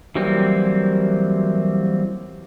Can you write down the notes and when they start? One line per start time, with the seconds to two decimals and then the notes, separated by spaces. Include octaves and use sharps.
0.15 E3 F#3 G3 A#3 C4